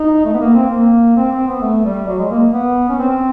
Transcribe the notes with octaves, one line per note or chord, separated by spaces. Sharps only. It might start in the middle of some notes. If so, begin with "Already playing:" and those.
Already playing: D#4
A3
B3
A#3
C4
A#3
C4
C4
B3
A3
G3
F#3
G#3
A#3
B3
C#4
C4